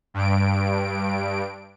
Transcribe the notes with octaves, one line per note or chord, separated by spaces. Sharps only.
G2 D7